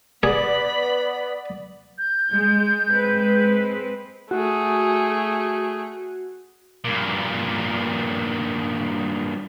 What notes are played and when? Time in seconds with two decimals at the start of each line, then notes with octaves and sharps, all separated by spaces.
0.23 B3 G#4 D5 B5
1.98 G6
2.34 G#3
2.90 G#3 C4 B4
4.31 A3 F#4 G#4
6.85 G2 A#2